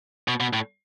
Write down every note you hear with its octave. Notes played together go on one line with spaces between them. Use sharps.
B2
B2
A2